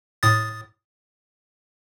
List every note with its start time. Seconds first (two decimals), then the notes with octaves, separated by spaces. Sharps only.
0.23 A2 D#6 A6